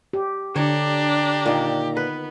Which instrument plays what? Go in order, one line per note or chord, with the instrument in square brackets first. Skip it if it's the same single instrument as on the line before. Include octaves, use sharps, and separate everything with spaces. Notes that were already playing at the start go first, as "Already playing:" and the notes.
[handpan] G4
[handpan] D3 [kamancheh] D4 [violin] G4 A#5 [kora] C#5
[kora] A#2 D#3
[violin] B3 [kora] B4